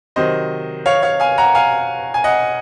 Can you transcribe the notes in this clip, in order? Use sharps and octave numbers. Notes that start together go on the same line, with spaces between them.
C3 D#3 F#3 C5 D#5
C#5 F5
C#5 F5
F5 G#5
F#5 A#5
F5 G#5
G#5
D#5 F#5